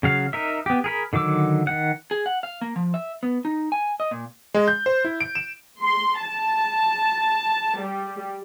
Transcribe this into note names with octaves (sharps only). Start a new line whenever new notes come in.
C#3 F#3 F5
D#4 A#4 E5
B3 G4
G#4 A#4 B5
D3 D#3 F#3 D6 E6
D#3 F#5
G#4
F#5
F5
A#3
F3
E5
B3
D#4
G#5
D#5
A#2
G#3
G6
C5
E4
D7
E7
C6
A5
G3